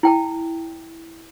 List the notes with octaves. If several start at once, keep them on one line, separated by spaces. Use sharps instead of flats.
E4 G5 A5